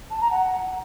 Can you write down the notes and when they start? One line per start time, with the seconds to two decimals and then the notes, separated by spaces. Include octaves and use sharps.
0.11 A5
0.21 A#5
0.31 F#5